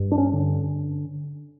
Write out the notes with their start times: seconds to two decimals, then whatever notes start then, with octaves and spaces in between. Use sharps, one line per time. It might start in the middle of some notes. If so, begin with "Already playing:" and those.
Already playing: G2
0.12 D4
0.18 C#4
0.33 D3